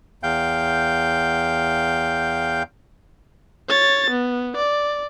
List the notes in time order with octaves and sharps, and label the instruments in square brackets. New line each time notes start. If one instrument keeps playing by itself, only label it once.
[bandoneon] E2 F5 G5 G6
[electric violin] C#5 A6
B3
D5